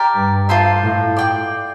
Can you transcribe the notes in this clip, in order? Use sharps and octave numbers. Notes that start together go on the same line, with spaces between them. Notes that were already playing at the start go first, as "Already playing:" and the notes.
Already playing: G4 A#4 D5
G2
F4 A4 C5 E5
A2
D5 G5 D6